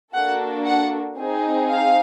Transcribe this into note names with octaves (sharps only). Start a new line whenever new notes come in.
A#3 D4 F#4 A4 F#5
F#5
C4 D#4 G#4
F5